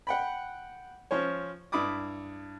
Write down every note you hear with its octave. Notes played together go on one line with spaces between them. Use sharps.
F#5 G5 B5
F3 C#4 C5 C#5
G2 E4 B5 D6 D#6